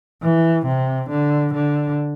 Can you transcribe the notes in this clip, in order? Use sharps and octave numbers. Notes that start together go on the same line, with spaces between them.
E3
C3
D3
D3